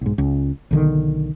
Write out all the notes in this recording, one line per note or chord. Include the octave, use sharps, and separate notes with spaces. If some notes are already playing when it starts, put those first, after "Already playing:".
B1 G#2
C#2
B1 D3 D#3